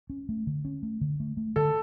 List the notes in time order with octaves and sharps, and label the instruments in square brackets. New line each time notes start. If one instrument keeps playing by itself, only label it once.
[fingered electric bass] C#4
A3
D3
C#4
A3
D3
A3
A3
[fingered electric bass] D3 [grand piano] A4